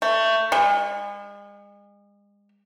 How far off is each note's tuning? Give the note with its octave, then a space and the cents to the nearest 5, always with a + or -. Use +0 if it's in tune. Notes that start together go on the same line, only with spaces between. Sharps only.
A3 +20
G#3 -40